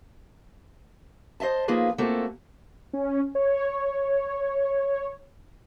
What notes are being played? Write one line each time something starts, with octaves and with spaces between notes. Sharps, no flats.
C5 D#5 E5 A5
F3 A#3 D#4 F4 G#4 B4
A3 A#3 C4 F4 F#4 A4
C#4
C#5